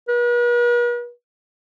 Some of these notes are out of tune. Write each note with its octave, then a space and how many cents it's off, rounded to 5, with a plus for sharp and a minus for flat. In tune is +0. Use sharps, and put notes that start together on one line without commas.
B4 -45